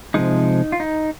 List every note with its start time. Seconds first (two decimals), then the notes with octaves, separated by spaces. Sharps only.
0.14 C3 F3 G#3 D#4
0.72 F4
0.80 D#4